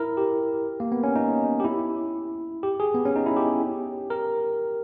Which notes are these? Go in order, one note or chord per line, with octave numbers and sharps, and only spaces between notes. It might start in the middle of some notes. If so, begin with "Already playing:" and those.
Already playing: E4 A#4
G4
A#3
B3
C#4
D#4
G4
E4
G4
G#4
B3
C#4
D#4
E4
G4
A#4